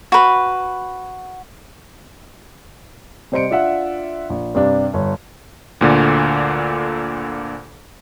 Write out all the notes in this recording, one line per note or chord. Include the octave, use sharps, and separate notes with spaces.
F#4 B4
C3 G3 C5 D#5 C#7 D7
D4 F4 E5 F#5
A#1
G2 C3 D4
G1 C#5
D2 A#2 D3